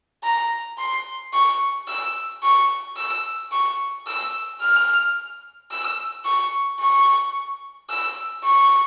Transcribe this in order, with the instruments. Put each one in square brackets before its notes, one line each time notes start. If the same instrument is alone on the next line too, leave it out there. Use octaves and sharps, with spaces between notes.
[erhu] A#5
C6
C#6
E6
C#6
E6
C#6
E6
F6
E6
C#6
C#6
E6
C#6